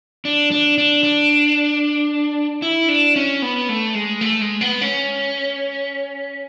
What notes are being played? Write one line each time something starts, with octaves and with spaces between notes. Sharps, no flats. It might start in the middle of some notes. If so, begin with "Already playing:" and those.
D4
D4
D4
D4
E4
D4
C#4
B3
A3
G#3
A3
G#3
B3
C#4